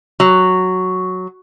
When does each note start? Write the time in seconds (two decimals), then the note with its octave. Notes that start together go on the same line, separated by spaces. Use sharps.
0.20 F#3